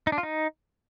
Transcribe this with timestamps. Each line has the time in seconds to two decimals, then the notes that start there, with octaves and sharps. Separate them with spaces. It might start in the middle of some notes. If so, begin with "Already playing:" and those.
0.07 D#4
0.12 D4
0.18 F4
0.23 D#4